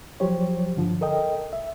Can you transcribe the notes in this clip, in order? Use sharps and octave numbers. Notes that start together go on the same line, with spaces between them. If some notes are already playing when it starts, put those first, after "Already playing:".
F3 F#3 G4 C5 C#5
G2 D3 F3
A4 A#4 D#5 G5
E5